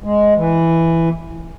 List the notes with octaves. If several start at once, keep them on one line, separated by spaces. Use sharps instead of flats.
G#3
E3